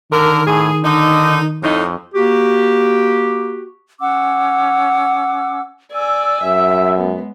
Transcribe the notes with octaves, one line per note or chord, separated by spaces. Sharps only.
D3 D#3 A#4
A2 G#4
D3 D#4
F2 A2 D#4
A#3 F#4 G4
C#4 F#5 D6 E6
D5 G#5 E6
F#2 E5
G#3 B3